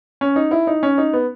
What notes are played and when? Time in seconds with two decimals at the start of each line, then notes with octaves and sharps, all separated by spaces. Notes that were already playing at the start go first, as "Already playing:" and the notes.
0.21 C#4
0.36 D#4
0.51 E4
0.67 D#4
0.83 C#4
0.98 D#4
1.13 B3